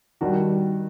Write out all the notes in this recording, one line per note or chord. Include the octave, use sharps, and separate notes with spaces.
D#3 G3 D4 F#4